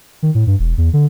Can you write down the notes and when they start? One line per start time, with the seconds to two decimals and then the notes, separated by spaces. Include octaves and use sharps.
0.23 D#3
0.35 A2
0.47 G2
0.59 E1
0.78 E2
0.93 D3